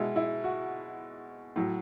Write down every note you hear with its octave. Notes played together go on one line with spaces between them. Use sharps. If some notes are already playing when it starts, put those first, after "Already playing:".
Already playing: B2 G#3 E4
E4
F#4
A2 F#3